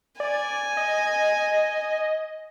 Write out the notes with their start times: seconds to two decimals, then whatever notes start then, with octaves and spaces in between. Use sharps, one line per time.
0.20 D5 G#5
0.77 D#5